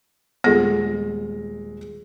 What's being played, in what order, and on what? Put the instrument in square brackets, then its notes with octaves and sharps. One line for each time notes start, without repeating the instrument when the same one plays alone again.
[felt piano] D#1 G#3 A#6 [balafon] B3 F4